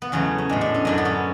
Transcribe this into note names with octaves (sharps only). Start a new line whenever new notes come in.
B3
E2 C#3 F#3 A3 C#4
C#4
A2 G#3 D4
D4
C#4
F#2 D3 F#3 D4
B3
C#4